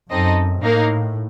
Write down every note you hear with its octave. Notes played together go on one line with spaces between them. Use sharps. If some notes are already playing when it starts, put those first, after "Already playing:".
F#2 C4 D#4 A4 D#5
A2 A#3 D#4 A#4 F5